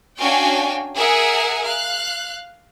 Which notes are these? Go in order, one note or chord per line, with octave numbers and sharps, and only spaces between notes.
C#4 D4 F#4 F5 G5 G#5
G#4 A#4 E5 F#5 G#5
F5 F#6